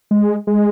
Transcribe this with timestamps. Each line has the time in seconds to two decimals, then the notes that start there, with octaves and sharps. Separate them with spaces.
0.11 G#3
0.47 G#3